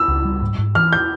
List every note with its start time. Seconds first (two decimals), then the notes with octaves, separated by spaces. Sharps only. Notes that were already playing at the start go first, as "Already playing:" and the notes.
Already playing: E6
0.08 C#2
0.25 G3
0.42 G#2
0.58 G#2
0.75 E3 F6
0.93 G6